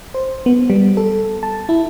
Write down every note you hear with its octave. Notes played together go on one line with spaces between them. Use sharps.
C5
B3
G3
A4
A5
E4